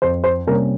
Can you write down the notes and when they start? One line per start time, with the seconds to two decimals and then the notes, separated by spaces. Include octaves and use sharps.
0.02 F2 C5
0.24 C5
0.47 C3 G3 A#3 C#4 A#4